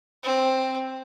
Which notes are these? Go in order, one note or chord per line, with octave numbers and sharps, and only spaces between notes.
C4